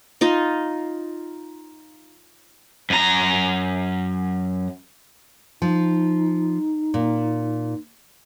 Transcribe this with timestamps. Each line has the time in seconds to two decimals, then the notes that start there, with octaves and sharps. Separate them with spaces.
0.21 D#4 F4 D#5
2.90 F#2 A#5
5.62 F3 D#4
6.94 A#2